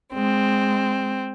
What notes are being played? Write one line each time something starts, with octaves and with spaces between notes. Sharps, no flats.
G#3 C4